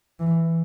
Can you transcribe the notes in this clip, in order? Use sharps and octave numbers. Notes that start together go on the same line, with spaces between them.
E3